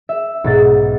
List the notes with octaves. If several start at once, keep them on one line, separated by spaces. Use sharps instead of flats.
E5
B1 G#2 A6